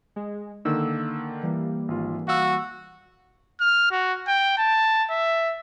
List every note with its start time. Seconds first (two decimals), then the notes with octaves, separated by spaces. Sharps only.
0.16 G#3
0.65 D3 D#3 A#3 E6
1.43 E3 G3 A#3
1.88 G#1 F4
2.28 F#4 F5 E6
3.60 F6
3.91 F#4
4.28 G5
4.58 A5
5.10 E5